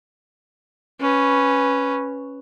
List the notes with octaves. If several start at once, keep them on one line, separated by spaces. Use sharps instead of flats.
C#4 B4